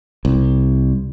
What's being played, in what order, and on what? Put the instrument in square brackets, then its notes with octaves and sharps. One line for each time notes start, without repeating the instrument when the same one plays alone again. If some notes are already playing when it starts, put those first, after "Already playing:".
[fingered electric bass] C2